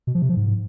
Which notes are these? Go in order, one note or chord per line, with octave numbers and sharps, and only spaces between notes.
B2
F3
C3
F3
G#2